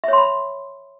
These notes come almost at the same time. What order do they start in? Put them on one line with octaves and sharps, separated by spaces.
E5 C#5 C6 B5